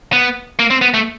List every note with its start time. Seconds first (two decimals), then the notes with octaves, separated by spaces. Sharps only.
0.13 B3
0.59 A#3
0.70 C4
0.82 B3
0.94 A3